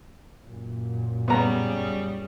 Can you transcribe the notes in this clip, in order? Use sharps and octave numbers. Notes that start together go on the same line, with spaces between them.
F#2 A#2
C#3 G3 B3 A#5